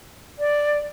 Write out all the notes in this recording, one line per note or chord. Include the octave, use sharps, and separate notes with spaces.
D5